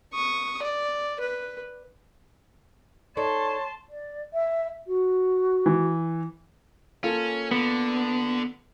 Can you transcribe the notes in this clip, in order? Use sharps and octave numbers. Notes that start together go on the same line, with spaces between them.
C#6 D#6
D5
B4
D#4 A4 C#5 D5 A5 C6
D5
E5
F#4
E3
A#3 C#4 F4 A4
D3 B3